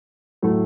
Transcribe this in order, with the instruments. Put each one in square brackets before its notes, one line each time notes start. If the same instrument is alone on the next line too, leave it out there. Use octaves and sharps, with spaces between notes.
[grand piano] A2 F#3 A3